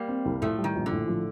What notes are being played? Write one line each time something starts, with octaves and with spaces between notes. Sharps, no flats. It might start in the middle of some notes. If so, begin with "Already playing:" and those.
Already playing: G3 A#3
C4
C2
A2 F3 A3
G3
D#3
A#1
D3
A2
F3